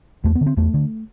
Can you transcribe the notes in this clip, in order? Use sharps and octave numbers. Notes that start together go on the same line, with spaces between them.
E2 A3
B3
D3
C4
E2 A3
D3